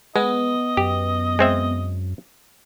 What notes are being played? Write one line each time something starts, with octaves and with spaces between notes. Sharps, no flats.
G#3 B3 D#5
F#2 G4
G#3 C4 E5